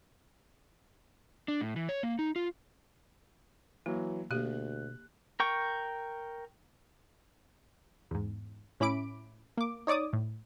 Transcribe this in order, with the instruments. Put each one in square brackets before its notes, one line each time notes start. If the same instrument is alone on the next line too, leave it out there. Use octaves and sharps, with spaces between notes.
[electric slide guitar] D4
A2
E3
C#5
A#3
D#4
F4
[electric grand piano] E3 F#3 [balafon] A#3
[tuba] D2 [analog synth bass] B2 [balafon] A#3 G4 [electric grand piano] F#6
[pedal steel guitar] A#4 G5 C#6
[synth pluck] E2 G#2
A2 C#4 E4 B5 D6 D7
A#3 D6
D#4 C#5 D5 D6 D#6
A2